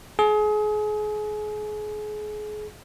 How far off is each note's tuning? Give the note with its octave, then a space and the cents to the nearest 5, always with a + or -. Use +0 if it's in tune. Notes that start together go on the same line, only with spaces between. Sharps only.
G#4 +30